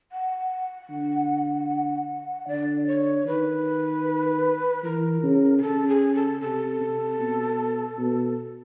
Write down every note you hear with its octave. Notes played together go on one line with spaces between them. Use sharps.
F#5
D3
D3 D5
C#5
D#3 B4
E3 A#4
C#3
G#4
C#3 A4
G#4
A4
C3 A4
C3
B2
B2